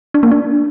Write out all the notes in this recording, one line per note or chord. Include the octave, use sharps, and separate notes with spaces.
D4
A#3
D4